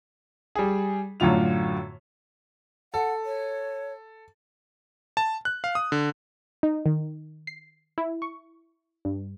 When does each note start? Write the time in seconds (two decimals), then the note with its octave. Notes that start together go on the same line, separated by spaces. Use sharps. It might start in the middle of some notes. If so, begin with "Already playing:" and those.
0.55 G3 G#4
1.20 F#2 A2 D3 F4 F7
2.94 A4 F#5
3.25 C#5
5.17 A5
5.45 F#6
5.64 F5
5.75 D#6
5.92 D3
6.63 D#4
6.86 D#3
7.47 C7
7.98 E4
8.22 C#6
9.05 G2